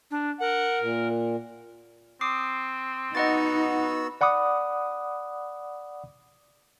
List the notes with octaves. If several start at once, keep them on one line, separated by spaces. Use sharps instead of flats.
D4
A#4 F#5
A#2
C4 D6 D#6 C7
B3 D#4 F#4 D#5 F#5 E6 A6
D5 F#5 B5 D6 D#6